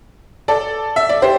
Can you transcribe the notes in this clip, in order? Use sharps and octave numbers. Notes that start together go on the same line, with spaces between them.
A4 D5
E5
D5
G4 C5